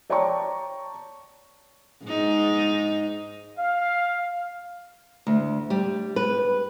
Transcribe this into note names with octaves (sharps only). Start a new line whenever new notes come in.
C#5 D5 G5 A5 A#5 C#6
G#2 D#4
F5
D2
G3
B4